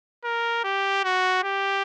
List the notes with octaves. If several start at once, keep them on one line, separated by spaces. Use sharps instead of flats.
A#4
G4
F#4
G4